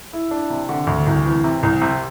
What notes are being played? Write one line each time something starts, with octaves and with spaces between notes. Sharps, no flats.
E4
D4
C3
D3
D2
C2
E3
C3
C2
C3